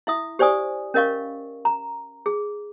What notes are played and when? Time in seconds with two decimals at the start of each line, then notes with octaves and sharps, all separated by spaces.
0.07 E4 E5 D#6
0.39 G4 C5 D5 G#5 D#6
0.94 C#4 A#4 D#5 F5 C#6
1.65 A#5
2.26 G#4